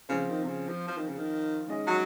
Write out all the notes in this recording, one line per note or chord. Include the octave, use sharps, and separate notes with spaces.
C#3 F3 C4 F4 C5
D#3
C3
C#3
F3
F3
D#3
C#3
D#3
D#3 G#3 C#4 G#4 D#5
F#3